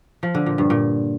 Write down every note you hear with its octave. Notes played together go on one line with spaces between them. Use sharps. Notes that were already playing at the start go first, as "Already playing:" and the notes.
F3
D3
A#2
G2
A#2